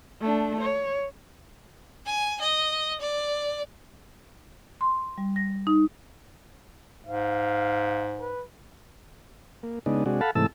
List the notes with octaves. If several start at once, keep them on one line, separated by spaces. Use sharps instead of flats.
A3 D4
C#5
G#5
D#5
D5
C6
G3
A#6
D#4
G#2 F5
B4
A#3
C#3 G#3 B3 D4 D#4
C3 G#3 D4 F#4
A4 F5 F#5 A5 B5
G#2 C3 E3 A3 A5 E6